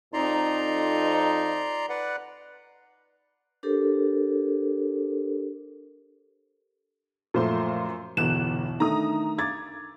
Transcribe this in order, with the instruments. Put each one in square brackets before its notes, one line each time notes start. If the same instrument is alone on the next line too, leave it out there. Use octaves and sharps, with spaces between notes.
[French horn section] F2 D#4 [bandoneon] D5 A#5 C6
[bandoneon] B4 D5 F#5
[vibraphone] D4 G4 A4 A#4 C5
[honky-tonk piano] F#2 C5 C6 [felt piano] A#2 F3 A3
[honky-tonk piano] G1 F#6 E7 [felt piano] E2 B2
[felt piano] D#3 A3 D4 [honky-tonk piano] A#5 D#6
[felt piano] D6 G#6 A6